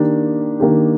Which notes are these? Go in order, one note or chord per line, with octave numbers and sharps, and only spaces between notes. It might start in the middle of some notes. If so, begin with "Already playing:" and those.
Already playing: D#3 A#3 D4 G4
D#3 A#3 D4 G4